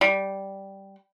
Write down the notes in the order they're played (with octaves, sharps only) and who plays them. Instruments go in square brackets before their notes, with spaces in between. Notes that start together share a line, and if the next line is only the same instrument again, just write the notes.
[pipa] G3